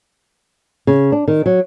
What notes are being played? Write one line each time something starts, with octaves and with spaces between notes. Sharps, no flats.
C#3
D4
D#3
F#3